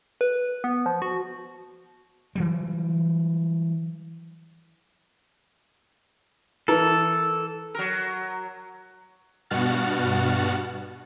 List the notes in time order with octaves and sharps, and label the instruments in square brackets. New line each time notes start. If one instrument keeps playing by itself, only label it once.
[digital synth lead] B4
B3
F3
F#4
[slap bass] E3 F#3 G3
[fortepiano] E3 A#4 [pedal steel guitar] A4
[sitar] F#3 A#4
[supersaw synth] G2 B2 F#4 F#5 F6 A6